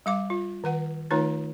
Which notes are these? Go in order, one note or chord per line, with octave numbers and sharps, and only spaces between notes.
G3 F5 D6
F4
D#3 B4 F#5
D#3 A3 D#4 F4 B4 C#5